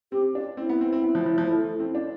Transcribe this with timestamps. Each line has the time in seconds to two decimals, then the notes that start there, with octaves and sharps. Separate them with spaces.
0.12 C4 G4
0.35 D4
0.57 C4 E4
0.69 B3
0.81 C4
0.92 C4
1.03 B3
1.15 F3
1.26 F3
1.38 F3
1.49 A3
1.64 A3
1.79 C4
1.95 D4